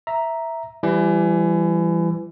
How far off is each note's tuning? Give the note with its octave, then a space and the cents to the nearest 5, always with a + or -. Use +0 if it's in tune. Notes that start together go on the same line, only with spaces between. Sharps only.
E5 +0 A#5 +0
E3 +30 G3 +5